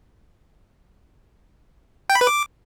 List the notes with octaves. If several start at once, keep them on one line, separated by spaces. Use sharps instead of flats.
G5
B5
B4
D6